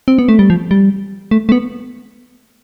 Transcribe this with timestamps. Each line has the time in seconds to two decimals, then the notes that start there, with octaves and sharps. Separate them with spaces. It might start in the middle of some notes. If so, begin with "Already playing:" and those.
0.08 C4
0.19 B3
0.29 A3
0.39 G3
0.50 F3
0.71 G3
1.31 A3
1.49 A3
1.52 B3